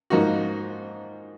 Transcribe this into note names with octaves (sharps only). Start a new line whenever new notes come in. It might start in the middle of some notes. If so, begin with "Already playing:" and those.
G#2 F3 A#3 D#4 F#4